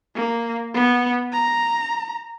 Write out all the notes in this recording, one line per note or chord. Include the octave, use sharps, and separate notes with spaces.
A#3
B3
A#5